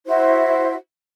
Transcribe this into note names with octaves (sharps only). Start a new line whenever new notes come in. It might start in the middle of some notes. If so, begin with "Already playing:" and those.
E4 F#4 C5 E5